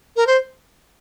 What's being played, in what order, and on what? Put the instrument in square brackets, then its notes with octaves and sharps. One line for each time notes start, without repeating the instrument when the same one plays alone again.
[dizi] A#4
C5